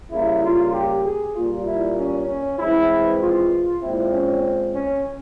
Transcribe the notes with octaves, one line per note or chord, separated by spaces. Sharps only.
C#3 G3 A#3 E4
F4
G4
G#4
A#2 G3 A#3 F4
E4
C#4
C#4
E3 G#3 C4 E4
F4
A#2 G#3 C4 E4
C#4
C#4